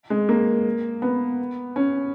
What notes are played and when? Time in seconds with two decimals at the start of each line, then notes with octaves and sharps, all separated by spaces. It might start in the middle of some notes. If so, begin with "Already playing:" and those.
0.10 G#3
0.29 A#3
1.02 B3
1.76 C#4